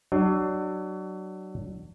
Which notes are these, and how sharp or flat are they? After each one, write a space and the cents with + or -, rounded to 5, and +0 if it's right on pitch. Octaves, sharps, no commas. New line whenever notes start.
F#3 +25 D4 +30